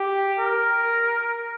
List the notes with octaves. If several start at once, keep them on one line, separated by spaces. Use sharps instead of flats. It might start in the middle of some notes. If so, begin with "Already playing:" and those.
Already playing: G4
A#4